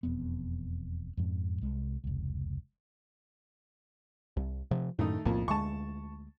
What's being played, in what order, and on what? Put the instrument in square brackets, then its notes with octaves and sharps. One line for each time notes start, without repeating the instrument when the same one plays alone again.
[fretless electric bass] E1 F2 B3
F2 G#2 F3
C2 G#3
F1 C#2
[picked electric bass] C2
C3 F3
[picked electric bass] F#2 A2 [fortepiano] D#3 A3 D#4
[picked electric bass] B1 A2 A#3 [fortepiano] F2
[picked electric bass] D2 G#3 [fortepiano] A5 C#6